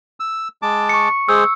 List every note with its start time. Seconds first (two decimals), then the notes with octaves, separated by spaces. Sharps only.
0.20 E6
0.62 G#3 A5 D6
0.89 C#6 C#7
1.29 G#3 G#4 C5 E6